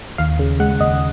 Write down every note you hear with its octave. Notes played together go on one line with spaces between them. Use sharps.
D#2 F5
C#3
G#3 F#5
D#2 D#5